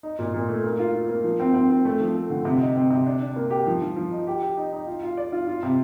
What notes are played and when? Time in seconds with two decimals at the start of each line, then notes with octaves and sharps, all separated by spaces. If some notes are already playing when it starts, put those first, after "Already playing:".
0.03 D#4
0.19 A#2
0.34 A#2
0.49 A3
0.64 A#3
0.79 F4
0.94 F4
1.09 A#3
1.24 F3
1.40 C4
1.54 C4
1.70 C4
1.85 A3
2.00 F3
2.15 A3
2.30 D3
2.45 C3
2.60 D#4
2.75 C4
2.90 C3
3.06 D4
3.20 D4
3.36 A#3
3.50 G4
3.67 F3
3.82 F3
3.96 F3
4.12 D#4
4.27 G4
4.42 G4
4.57 D#4
4.73 D#4
4.87 F4
5.03 F4
5.17 D5
5.32 F4
5.47 F4
5.63 C3